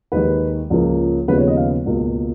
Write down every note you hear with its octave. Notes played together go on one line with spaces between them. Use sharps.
D#2 D#3 G#3 B4
C#2 C#3 F3 A#3
D#2 C#3 F3 G#3 B3 B4
C#5
D#5
F5
C#2 B2 A#3